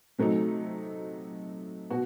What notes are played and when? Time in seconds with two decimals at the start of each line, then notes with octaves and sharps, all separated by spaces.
0.18 C3 F#3 A3 D#4
1.90 B2 F#4